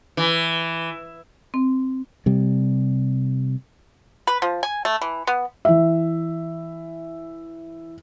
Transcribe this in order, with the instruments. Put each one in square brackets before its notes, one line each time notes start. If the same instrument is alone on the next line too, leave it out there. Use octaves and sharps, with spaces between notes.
[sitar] E3
[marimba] C4
[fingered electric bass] C3 G3
[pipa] B4
F3
G#5
A3
E3
B3
[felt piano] E3 E5